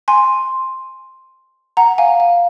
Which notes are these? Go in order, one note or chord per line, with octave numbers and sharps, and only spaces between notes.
G#5 C6
F#5 A#5
F5 G#5
F5